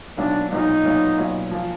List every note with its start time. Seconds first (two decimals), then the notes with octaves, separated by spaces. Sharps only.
0.17 B1 A#2 F#3 B3 D4
0.51 B1 A#2 F#3 B3 D#4
0.85 B1 A#2 F#3 B3
1.18 B1 A#2 F#3 B3
1.51 F3 A#3